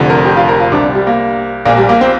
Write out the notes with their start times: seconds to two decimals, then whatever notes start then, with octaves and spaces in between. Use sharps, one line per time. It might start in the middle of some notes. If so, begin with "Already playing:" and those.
Already playing: F1 F2 D3
0.10 A#4
0.25 G4
0.37 F4
0.49 A#4
0.60 F4
0.72 C2 C3 D4
0.95 G3
1.07 A#3
1.65 A#1 A#2 A#3
1.77 G3
1.89 A#3
2.01 C4